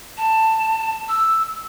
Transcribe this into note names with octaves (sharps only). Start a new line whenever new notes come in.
A5
E6